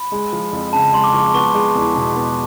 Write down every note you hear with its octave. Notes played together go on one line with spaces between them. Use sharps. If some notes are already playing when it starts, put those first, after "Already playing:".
Already playing: B5
G#3
F3
F2
C#3 A5
G#3 C6
D6
F3 C#6
B3 C#6
G#3
E2
B2
B3